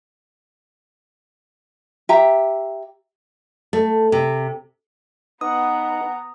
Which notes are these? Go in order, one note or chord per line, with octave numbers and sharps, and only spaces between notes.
G4 E5 A#5
A3
C3
B3 D#4 B4 F#5 A#5 D#6